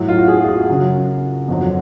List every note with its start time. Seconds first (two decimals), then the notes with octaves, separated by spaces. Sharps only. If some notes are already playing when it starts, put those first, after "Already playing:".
Already playing: A2 F#3
0.08 F4
0.19 F#4
0.28 G#4
0.44 F4
0.48 F#4
0.69 F#2 C#3 F#3
1.48 F2 D3 F#3